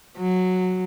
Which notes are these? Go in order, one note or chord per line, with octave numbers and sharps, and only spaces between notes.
F#3